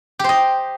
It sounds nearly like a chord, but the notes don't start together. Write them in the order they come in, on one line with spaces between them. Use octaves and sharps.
G4 C5 D#5